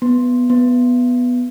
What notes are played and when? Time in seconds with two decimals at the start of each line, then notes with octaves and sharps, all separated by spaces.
0.02 B3
0.50 B3